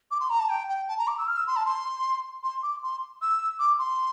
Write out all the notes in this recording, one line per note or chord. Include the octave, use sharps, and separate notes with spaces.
D6
C6
A#5
A5
G5
G5
A5
A#5
D6
E6
F6
E6
C6
A5
C6
C6
D6
C6
E6
D6
C6